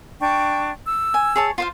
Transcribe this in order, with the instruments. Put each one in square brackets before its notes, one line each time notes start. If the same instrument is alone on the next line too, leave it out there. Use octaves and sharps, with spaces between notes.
[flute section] D4 G5 C#6
E6
[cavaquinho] G#5
G#4 C#5 A5
F4 C5 F5